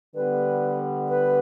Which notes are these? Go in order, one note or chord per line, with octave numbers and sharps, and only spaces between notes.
D3 G3 B3 B4
B4